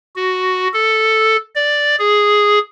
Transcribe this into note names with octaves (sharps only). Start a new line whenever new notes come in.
F#4
A4
D5
G#4